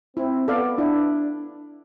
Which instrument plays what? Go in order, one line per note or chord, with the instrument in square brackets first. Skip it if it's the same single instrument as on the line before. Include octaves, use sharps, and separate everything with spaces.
[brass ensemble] C4 [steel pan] E4
[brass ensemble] B3 [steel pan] A4 D5 F5
[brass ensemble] D4 [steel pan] E4